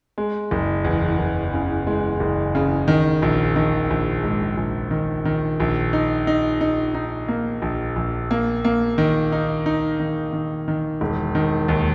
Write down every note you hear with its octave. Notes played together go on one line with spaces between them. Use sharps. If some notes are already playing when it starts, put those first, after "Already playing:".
G#3
F#1
E2
F#1
C#3
G#3
F#1
C#3
D#3
A#1
D#3
A#1
G#2
A#1
D#3
D#3
A#1
D#4
D#4
D#4
D#4
A#3
A#1
A#1
A#3
A#3
D#3
D#4
D#4
D#3
D#3
D#3
E1
D#3
D#2